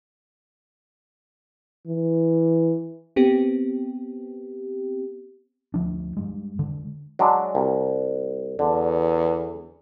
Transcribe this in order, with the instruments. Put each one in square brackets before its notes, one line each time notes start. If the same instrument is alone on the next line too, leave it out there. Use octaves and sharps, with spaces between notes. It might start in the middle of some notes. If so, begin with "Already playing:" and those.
[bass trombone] E3
[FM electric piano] B3 C4 G4
[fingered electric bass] D2 F3 D4
G2 G#3
D3 G#3
[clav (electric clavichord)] F#3 G#3 D4
C2
[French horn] E2 [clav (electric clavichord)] D3